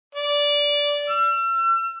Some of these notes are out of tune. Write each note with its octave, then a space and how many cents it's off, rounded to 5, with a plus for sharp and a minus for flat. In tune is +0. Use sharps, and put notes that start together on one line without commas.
D5 -15
E6 +40